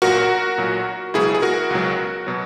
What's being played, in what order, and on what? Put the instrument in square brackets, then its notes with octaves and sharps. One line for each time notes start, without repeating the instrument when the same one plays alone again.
[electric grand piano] B1 A#2 F#3 F#4 A#4
B1 A#2 F#3
C#2 B2 F#3 E4 G#4
G#4
F#4 A#4
C#2 B2 F#3
B2 F#3